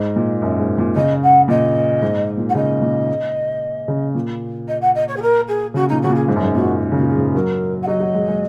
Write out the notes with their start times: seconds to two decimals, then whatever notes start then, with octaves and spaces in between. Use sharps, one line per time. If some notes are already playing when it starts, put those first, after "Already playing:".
Already playing: G#2 D#5
0.16 A#2
0.42 F#2
0.59 G#2
0.78 A#2
0.95 C#3 D#5
1.23 F#5
1.48 A#2 D#5
2.02 G#2
2.37 A#2
2.49 F#5
2.55 C#3 D#5
2.82 A#2
3.88 C#3
4.15 A#2
4.68 D#5
4.81 F#5
4.94 D#5
5.08 C#5
5.16 G#4
5.22 A#4
5.47 G#4
5.74 C#3 F#4
5.88 A#2 D#4
6.02 C#3 F#4
6.10 A#2
6.15 G#4
6.28 G#2
6.36 F#2
6.43 G#2
6.55 A#2 F#4
6.92 C#3
6.97 A#2 F#4
7.08 G#4
7.16 G#2
7.34 F#3 A#4
7.82 F#5
7.87 F#3 D#5
8.00 F#3
8.15 G#3
8.28 G#3